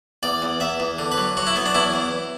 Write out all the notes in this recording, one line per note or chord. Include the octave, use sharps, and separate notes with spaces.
E2 D5
E2
E2 E5
E2
D3
B4
F#3
F#3 F#4
E4
F#3 B3
D4
E2 E4
E2